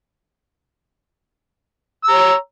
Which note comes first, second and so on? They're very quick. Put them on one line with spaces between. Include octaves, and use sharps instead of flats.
E6 A#5 C#5